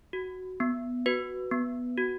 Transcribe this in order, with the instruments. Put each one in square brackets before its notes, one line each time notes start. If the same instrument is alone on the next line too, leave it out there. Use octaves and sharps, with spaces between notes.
[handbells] F#4
B3
F#4 B4
B3
F#4